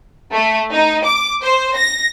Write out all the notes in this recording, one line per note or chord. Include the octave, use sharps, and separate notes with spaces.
A3
D#4
D6
C5
A#6